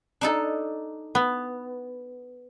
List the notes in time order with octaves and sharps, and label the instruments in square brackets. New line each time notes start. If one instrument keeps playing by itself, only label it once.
[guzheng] D4 D#4 A4
[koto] B3